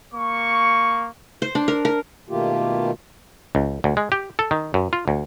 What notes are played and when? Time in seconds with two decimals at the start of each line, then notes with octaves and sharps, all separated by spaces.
0.14 A#3 C#6
1.42 C5
1.55 D4
1.68 A#4
1.85 A#4
2.29 B2 D#3 A3 A#3 F4 G4
3.55 C#2
3.84 D2
3.97 G#3
4.12 G4
4.39 A4
4.51 D#3
4.74 F#2
4.93 F4
5.08 D2